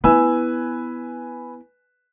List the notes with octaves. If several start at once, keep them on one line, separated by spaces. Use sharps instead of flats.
B3 E4 B4 G#5 E6